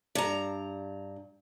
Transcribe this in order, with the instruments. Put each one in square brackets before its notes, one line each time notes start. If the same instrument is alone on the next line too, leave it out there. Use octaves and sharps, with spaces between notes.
[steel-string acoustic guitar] G2 A#5